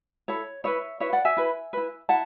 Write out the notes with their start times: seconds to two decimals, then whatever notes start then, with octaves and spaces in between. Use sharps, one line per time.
0.28 E4 A4 C#5
0.64 E4 B4 C#5 E5
1.00 E4 B4 C#5 E5
1.13 D5 F#5
1.25 E5 G#5
1.37 E4 B4
1.73 E4 B4
2.09 E4 F#5 A5